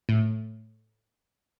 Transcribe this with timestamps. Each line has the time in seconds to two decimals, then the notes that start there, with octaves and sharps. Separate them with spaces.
0.09 A2